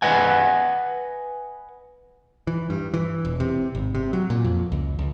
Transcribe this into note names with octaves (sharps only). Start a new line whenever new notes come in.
B4 D#5 F#5 G#5
E3
G2
E3
E1
C3
G#1
C3
F#3
A#2
F2
C#2
C#2